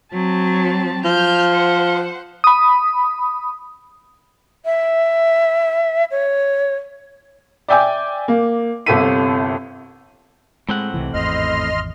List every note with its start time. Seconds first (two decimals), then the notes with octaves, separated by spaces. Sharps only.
0.12 F#3 C4 A5
1.05 F3 F6 G6
1.51 C5 F#5
2.44 B5 D#6
4.65 E5
6.11 C#5
7.68 D5 E5 G5 G#5 D6 G6
8.28 A#3
8.86 G1 C2 C3 A4 B6 D#7
10.69 A2 G#3 C4 F#5
10.94 C2 C3 D#3 E3
11.14 G#1 E2 D#5 C6 F6